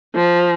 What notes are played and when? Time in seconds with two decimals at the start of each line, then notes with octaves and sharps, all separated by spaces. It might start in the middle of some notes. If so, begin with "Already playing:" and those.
0.15 F3